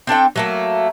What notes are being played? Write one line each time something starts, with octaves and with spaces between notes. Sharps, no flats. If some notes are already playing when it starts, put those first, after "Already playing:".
C4 D4 A4 G5
F#3 A3 A#3